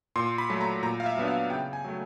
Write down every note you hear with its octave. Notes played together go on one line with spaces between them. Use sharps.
A#2 C6
B5
F#3 A3
A#5
A#2 A#5
F5
E5
F#3 B3 D4
F5
C#3 G5
G#5
F#3 A3